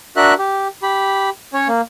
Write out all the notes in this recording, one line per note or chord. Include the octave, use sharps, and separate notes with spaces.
D4 F#4 A#4 E5 F#6
G4
G4 B5
C#4 C#5
A#3